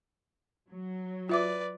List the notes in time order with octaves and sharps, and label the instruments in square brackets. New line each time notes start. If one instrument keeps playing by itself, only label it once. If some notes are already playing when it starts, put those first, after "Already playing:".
[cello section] F#3
[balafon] F4 E5 D6 [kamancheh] B4 D5